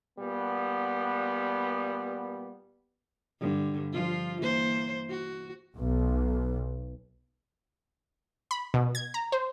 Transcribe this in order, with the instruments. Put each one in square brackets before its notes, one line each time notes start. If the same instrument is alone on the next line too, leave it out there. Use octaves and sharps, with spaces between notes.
[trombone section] A#2 G3 B3
[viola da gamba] G2 D3
F3 F4
E3 A#3 C5
F#4
[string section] B1
[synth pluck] B5
B2
G#6
A#5
C5